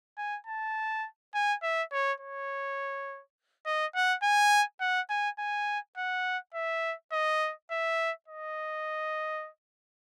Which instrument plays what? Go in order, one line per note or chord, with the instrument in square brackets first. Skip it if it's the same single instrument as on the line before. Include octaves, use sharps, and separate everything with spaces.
[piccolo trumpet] G#5
A5
G#5
E5
C#5
C#5
D#5
F#5
G#5
F#5
G#5
G#5
F#5
E5
D#5
E5
D#5